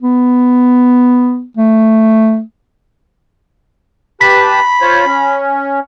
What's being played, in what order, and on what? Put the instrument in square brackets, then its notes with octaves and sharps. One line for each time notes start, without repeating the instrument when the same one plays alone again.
[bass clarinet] B3
A3
[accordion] G4 B4 A5 [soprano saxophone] B5 [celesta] B6
[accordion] F4 C5 C#5
C#4